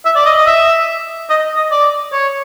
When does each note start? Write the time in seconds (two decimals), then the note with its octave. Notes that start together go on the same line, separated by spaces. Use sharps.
0.05 E5
0.16 D5
0.25 D#5
0.37 D#5
0.46 E5
1.30 D#5
1.57 D#5
1.71 D5
2.13 C#5